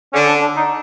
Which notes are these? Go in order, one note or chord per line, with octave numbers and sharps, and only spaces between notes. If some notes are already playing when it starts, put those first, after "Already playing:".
D3 C#4
D4
D4
D#4